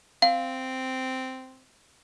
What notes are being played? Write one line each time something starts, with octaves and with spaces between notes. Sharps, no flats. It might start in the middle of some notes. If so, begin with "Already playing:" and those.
C4 F5